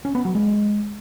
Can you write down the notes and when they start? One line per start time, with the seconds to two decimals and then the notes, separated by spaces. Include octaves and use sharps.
0.05 C#4
0.15 B3
0.25 F#3
0.35 G#3